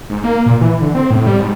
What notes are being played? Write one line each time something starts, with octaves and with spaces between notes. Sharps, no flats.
G#2
A#3
A#2
E3
D3
C4
A2
G3
G#2